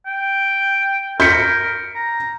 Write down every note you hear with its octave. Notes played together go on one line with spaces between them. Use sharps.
G5
A#4 G6 B6 C#7
A#5